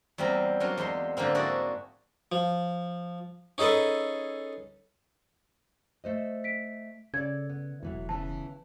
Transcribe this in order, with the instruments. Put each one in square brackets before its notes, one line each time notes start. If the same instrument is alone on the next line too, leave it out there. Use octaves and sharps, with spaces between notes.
[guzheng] E2 G3 A#3 C4 A#4
F#3 A#3 D4 F4
E2 G#3 C5 C6
G#2 D3 F3 A#3 C4
D4 E4 F#4 G#4 D5
[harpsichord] F3
C#4 D#4 G#4 A4 B4
[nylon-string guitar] A3 C5 D#5
[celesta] B6 D7
[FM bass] C#3 [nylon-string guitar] A4 D5 [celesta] G#6
[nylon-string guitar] B3
[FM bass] E1 [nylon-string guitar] A2 E3 F#3
[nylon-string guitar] C#3 E3 B3 [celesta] A5